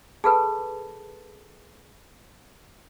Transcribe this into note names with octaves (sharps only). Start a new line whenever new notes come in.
G#4 A4 B4 A5 B5